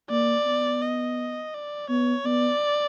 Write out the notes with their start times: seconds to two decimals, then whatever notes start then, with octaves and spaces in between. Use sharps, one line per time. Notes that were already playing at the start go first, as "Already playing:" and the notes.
0.10 A#3 D5
0.45 B3
0.82 D#5
1.54 D5
1.89 B3 C#5
2.25 B3 D5